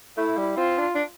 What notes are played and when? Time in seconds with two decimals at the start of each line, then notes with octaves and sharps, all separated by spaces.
0.17 A3 E4
0.37 G3
0.57 C4 F4
0.78 D4
0.95 D4